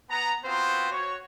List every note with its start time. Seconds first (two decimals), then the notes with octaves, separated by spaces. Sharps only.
0.10 B3 A#5
0.44 B3 C4 F4 F#4 B4 C5
0.91 F#4 C#5